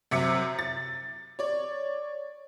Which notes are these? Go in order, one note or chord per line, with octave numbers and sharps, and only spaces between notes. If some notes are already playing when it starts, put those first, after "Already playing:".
F#2 C3 E5 C#7
A6
C#5 D5